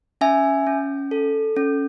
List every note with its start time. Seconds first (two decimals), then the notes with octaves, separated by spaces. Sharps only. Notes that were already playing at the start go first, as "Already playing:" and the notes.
0.21 C#4 E5 G#5
0.67 C#4
1.11 A4
1.56 C#4